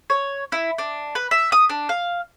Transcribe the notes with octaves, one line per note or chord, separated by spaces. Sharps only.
C#5
E4
D4
B4
E5
D#6
D4
F5